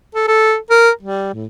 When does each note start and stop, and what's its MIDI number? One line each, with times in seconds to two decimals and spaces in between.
0.15 0.26 69
0.28 0.56 69
0.70 0.90 70
1.03 1.33 55
1.34 1.46 45